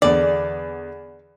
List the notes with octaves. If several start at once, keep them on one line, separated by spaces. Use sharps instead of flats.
E2 D3 D5